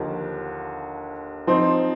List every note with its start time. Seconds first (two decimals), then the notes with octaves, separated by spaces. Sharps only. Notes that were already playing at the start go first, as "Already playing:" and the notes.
Already playing: D#2 D3 F3 A#3
1.47 F3 C4 D#4